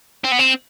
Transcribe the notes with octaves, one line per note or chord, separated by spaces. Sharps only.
C4
B3
C4